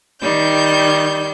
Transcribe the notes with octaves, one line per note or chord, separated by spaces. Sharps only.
D#3 G3 G6